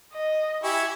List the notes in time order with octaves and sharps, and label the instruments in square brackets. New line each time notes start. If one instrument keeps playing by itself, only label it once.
[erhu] D#5
[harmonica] E4 G#5 C#6 [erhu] G4